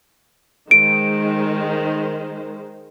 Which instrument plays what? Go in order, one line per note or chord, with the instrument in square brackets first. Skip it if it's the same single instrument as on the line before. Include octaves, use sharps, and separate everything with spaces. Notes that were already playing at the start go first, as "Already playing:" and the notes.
[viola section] D#3 G#3 C5 [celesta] D7